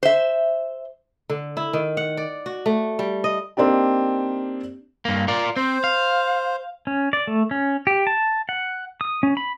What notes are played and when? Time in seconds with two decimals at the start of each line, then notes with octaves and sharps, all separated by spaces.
0.03 C5 E5
1.29 D3
1.57 E4
1.73 D#3
1.97 F#5
2.17 D5
2.46 F#4
2.66 A3
2.99 G3
3.24 D#5
3.57 A#3 C4 D4 D#4 G4
5.05 G2 A#3
5.28 F4 A#4 D5
5.57 C4 C5
5.84 F5
6.87 C#4
7.13 D5
7.27 A3
7.51 C#4
7.87 G4
8.07 A5
8.49 F#5
9.01 D#6
9.23 C#4
9.37 B5